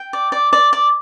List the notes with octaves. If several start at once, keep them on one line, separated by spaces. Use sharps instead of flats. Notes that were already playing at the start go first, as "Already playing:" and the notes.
Already playing: G5
D5
D5
D5
D5